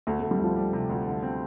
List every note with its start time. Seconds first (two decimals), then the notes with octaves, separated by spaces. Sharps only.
0.07 D2 A3
0.19 D2 A3
0.31 G3
0.39 D2 F3
0.56 G3
0.73 C3
0.89 D2
1.07 D3
1.23 C4